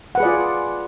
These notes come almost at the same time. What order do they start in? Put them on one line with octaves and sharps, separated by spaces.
F#5 B4 G#4 D5 F4